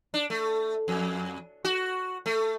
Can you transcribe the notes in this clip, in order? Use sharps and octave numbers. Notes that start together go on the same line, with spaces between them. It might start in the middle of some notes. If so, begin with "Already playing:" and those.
D4
A3
F2
F#4
A3